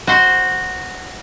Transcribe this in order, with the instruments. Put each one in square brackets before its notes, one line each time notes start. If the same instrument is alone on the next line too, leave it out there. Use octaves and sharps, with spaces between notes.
[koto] F#4 C5